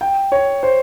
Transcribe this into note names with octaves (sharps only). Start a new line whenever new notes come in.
G5
C#5
C5